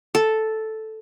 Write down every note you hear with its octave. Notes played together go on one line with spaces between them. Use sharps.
A4